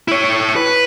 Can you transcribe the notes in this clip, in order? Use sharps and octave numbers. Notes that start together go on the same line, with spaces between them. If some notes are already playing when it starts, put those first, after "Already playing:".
E4 C#5
B4